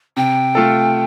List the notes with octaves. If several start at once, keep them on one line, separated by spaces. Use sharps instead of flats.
C3 G5
A3 F4 A4